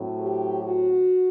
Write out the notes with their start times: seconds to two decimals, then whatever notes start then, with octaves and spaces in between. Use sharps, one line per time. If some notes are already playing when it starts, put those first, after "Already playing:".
Already playing: A2 F#3 C4
0.20 G4
0.62 F#4